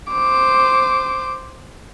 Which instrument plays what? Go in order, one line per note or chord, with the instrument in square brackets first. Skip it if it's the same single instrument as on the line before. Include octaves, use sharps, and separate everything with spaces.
[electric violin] C5 D6